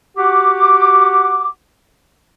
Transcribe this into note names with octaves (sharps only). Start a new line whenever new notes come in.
F#4 G4 F#5 D6